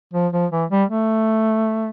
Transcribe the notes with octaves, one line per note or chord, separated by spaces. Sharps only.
F3
F3
E3
G3
A3